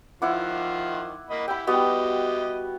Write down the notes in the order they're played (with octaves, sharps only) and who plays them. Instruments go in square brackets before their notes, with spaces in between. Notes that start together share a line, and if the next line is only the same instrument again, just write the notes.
[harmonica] D#3 F3 [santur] E4 F#5 D6
[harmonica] A#3 D#5 B5
[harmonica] E4 G4 E5 [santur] G5 B5
[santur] G3 B3 F#4 [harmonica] G4 D#5